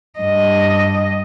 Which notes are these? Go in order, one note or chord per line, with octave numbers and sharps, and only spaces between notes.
G2 D#5